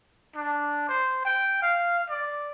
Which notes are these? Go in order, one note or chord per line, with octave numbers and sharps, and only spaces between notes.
D4
C5
G5
F5
D5